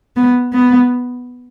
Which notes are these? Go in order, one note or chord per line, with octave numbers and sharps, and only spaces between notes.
B3
B3